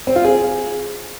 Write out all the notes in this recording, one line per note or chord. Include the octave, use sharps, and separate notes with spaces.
C4
F4
G#4